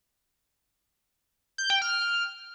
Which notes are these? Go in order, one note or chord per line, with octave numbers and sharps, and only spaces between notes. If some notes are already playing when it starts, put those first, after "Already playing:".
G6
G5
F6